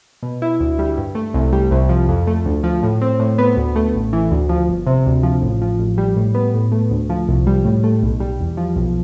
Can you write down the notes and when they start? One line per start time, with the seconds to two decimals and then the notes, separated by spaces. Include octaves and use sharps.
0.23 B2
0.42 E4
0.61 D2
0.79 G3
0.98 G2
1.15 A3
1.34 C2
1.53 G3
1.71 C2
1.89 F3
2.09 F2
2.27 A3
2.46 D2
2.63 F3
2.83 A2
3.02 C4
3.19 A2
3.38 B3
3.57 D2
3.76 A3
3.95 A1
4.13 E3
4.31 D2
4.49 F3
4.69 G1
4.87 C3
5.06 D2
5.23 F3
5.42 A1
5.62 F3
5.79 A1
5.98 G3
6.17 A2
6.35 B3
6.54 A2
6.72 A3
6.90 D2
7.10 F3
7.28 C2
7.47 G3
7.65 A2
7.84 A3
8.02 B1
8.20 G3
8.40 E2
8.57 F3
8.76 B1